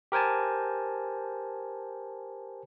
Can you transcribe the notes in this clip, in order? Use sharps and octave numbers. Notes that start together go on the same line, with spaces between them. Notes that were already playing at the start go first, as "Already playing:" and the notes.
G4 A#4 C5 G#5 A5